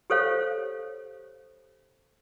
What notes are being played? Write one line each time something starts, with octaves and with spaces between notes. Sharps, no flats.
G4 A4 C5 C#5 F5